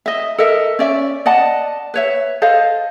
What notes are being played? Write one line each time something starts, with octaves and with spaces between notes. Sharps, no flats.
D#5 E5
A4 A#4 D#5 E5
C#4 D5 E5
D5 D#5 F#5 A5
B4 C#5 E5
A4 C5 D#5 F5